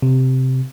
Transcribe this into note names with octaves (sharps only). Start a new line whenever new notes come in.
C3